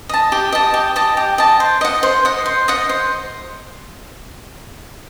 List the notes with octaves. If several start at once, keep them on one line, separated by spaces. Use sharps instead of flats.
D#5 A5
G4
D#5 A5
G4
D#5 A5
G4
D#5 A5
C5
D#5 F#5
C5
D#5 F#5
C5
D#5 F#5
C5